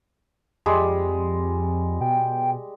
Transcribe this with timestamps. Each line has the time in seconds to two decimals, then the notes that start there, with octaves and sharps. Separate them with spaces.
0.66 F2 G3 G#3
2.01 B2 G5